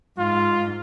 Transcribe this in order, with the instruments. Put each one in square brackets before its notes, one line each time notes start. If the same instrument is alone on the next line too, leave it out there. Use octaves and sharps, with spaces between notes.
[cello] G#2 [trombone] F4